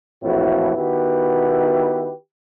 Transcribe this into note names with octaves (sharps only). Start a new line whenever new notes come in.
A#1 F2 A2 E3 E4 F#4
D#3 B3 E4 F#4 G4 B4